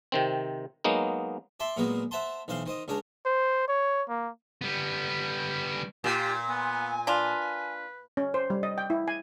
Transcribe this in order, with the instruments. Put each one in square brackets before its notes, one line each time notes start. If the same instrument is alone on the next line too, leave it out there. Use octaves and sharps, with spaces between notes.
[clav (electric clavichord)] C3 D#3 C4
F#3 G#3 A#3 B3 D#4
[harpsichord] D5 E5 A5 C6
A#2 F#3 G#3 A#3 B3
C5 E5 F#5 A5 A#5 C6
B1 E3 C5 F5 C6
D#3 C5 D#5
C#2 C#3 D4 C#5 A#5
[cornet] C5
C#5
A#3
[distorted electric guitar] G3 B3
[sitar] A#2 [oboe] F4 [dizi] G4
[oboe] B3 [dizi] G#5
[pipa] D4 F4 [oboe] B4
[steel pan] C#4
C5
G3
D#5
G5
E4
G#5